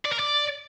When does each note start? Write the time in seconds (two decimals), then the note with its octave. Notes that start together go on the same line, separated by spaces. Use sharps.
0.05 D5
0.12 A#4
0.19 D5